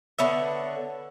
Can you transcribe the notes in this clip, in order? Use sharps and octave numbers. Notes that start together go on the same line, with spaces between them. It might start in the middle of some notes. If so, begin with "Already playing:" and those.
D3 B3 C#5 E5